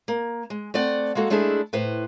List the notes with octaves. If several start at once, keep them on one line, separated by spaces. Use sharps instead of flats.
A#3
G#3
A3 C4 D5 F#5
G#3 A#3 F#4 A4
G#3 A3 D4 E4 G#4 A4
A2 B4 C5